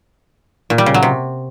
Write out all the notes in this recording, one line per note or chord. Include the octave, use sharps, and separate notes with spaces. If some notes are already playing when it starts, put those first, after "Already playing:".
A#2
G3
C#3
F#3
C3